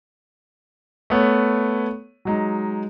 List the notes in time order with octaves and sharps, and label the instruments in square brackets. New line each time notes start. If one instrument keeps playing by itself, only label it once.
[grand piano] A3 B3 C#5
F#3 G#3 D#4